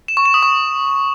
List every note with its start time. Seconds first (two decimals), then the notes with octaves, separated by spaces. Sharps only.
0.08 E7
0.17 C#6
0.25 E7
0.34 D#6
0.43 C#6